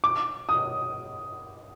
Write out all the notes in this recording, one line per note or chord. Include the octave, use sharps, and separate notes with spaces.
D6
D#6